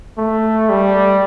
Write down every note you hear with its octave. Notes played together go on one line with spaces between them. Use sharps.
A3
G3